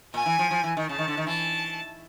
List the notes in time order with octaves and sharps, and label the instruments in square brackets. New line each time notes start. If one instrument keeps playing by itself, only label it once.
[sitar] A#2 [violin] G#5
[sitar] E3
F3
F3
E3
D#3
[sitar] C#3 [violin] A5
[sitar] D#3
D3
D#3
[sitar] E3 [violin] A5